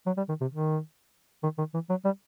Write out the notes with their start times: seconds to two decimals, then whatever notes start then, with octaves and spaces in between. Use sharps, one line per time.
0.06 F#3
0.17 G3
0.29 D#3
0.41 C3
0.51 D#3
1.43 D#3
1.58 D#3
1.74 E3
1.90 F#3
2.05 G3